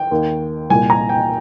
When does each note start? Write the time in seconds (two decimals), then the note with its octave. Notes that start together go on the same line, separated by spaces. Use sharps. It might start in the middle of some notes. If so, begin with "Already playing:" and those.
Already playing: G5
0.11 D#2 D#3
0.70 C2 A#2 G#5
0.90 A#5
1.09 G5